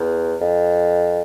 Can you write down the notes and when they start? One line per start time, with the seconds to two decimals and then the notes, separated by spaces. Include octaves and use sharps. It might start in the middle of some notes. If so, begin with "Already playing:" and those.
Already playing: E2
0.41 F2